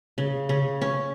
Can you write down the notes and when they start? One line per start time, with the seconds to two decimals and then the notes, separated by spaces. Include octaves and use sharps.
0.18 C#3
0.49 C#3
0.81 C#4